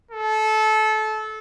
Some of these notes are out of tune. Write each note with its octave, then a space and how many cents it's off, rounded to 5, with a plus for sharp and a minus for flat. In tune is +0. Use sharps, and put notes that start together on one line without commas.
A4 -25